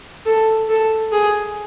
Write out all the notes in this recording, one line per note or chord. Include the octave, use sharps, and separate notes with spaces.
A4
A4
G#4